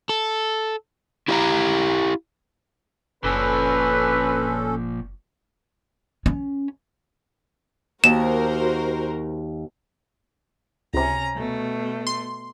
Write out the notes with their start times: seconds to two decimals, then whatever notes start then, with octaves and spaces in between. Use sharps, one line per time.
0.09 A4
1.28 E4 G4 A4 D#5 F5 A#5
3.24 F#1 A#2 F3 C#4 A4 B4
6.26 C#4
8.04 D#2 F#4 A#4 C5 E7
10.94 C#2 C3 C#4 A#5
11.36 B2 A3
12.07 C6